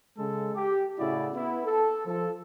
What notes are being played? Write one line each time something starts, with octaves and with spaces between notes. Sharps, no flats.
C#3 G#3 A4
G4
A2 C#3 E4 F#4 D5 E5
B3 E4
A4
F3 A4